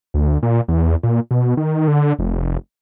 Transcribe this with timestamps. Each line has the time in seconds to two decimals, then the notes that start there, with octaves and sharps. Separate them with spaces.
0.14 D2
0.43 A#2
0.68 E2
1.03 A#2
1.31 B2
1.57 D#3
1.88 D3
2.19 F1